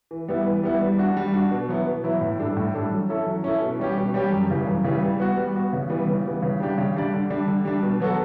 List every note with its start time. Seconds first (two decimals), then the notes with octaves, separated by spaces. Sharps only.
0.11 E3
0.28 G3 B3 E4
0.46 E3
0.63 G3 B3 E4
0.81 G3
0.98 D4 F#4
1.17 G3
1.34 D4 F#4
1.51 B2
1.69 F#3 B3 E4
1.87 B2
2.04 F#3 B3 E4
2.21 A2
2.39 G3 D4 A4
2.57 A2
2.74 G3 D4 A4
2.91 F#3
3.09 C#4 E4 A4
3.26 F#3
3.44 C#4 E4 A4
3.62 B2
3.79 G3 C#4 G4
3.97 B2
4.14 G3 C#4 G4
4.32 F#2
4.50 C#3 E3 G3
4.67 F#2
4.84 C#3 E3 G3
5.02 G3
5.20 B3 F#4
5.37 G3
5.55 B3 F#4
5.73 C#3
5.90 E3 G3 B3
6.07 C#3
6.25 E3 G3 B3
6.42 C#3
6.60 G3 D4 G4 D5
6.78 C#3
6.95 G3 D4 G4 D5
7.13 D3
7.30 G3 D4
7.47 D3
7.65 G3 D4
7.83 B2
8.00 F#3 B3 F#4 A4